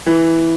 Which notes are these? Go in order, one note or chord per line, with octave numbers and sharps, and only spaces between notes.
E3